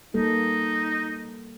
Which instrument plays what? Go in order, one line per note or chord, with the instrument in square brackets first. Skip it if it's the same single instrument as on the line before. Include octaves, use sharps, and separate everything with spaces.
[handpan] G3 A#3 A4 [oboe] D#4